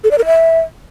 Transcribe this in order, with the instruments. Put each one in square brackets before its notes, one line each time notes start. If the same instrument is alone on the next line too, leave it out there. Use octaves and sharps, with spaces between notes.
[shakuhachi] A4
D5
A#4
E5